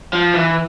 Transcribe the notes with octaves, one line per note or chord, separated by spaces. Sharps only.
F3
E3